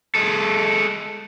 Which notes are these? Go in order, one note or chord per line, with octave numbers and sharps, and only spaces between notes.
G#3 A4